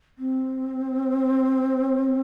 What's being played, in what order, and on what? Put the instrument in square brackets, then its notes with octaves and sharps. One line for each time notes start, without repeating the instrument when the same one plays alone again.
[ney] C4